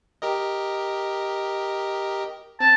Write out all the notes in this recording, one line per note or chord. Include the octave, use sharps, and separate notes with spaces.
G4 A#4 D#5
C4 A5